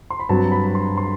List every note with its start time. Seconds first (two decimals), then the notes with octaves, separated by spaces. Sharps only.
0.10 C6
0.20 B5
0.29 G2 F#3 C4 A5
0.52 B5
0.75 C6
0.97 C6